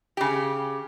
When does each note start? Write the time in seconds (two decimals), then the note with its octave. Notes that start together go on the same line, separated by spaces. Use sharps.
0.17 C#3 G4